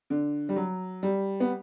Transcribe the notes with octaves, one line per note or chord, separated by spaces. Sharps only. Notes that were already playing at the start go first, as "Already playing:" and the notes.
D3
G3
F#3
G3
B3